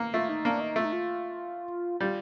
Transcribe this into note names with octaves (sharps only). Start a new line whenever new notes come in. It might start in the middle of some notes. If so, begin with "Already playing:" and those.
Already playing: A#3
A3 F4
D#4
A#3 D4
D#4
A3 F4
D#4
F4
G3 F4